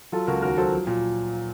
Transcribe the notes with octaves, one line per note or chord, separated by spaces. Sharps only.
F#3 F4 A4
C#2 F#4 A#4
D#2 F#4 A#4
F#3 A4 C5
F3
A#2